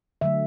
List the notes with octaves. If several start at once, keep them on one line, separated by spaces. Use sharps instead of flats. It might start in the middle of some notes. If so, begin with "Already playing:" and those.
D3 F#3 A3 E5